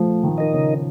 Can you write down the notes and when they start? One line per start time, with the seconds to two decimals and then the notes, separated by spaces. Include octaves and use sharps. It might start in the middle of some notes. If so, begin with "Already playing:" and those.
Already playing: F3 A3
0.23 D#3
0.38 D#4 A#4 D#5
0.54 C#3